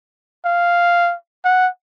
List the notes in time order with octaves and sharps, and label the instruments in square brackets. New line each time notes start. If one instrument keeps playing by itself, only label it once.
[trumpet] F5
F#5